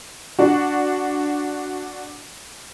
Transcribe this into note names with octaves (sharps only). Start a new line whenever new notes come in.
D4 F#4